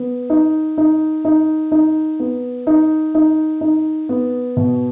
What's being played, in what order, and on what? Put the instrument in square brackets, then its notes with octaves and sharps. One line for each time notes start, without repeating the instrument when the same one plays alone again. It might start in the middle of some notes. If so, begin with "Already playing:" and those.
Already playing: [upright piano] B3
D#4
D#4
D#4
D#4
B3
D#4
D#4
D#4
B3
B2